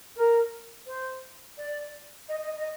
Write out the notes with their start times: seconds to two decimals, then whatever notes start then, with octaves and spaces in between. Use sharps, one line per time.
0.16 A#4
0.86 C5
1.57 D5
2.28 D#5
2.42 D#5
2.56 D#5